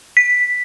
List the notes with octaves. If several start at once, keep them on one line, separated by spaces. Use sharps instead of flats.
B6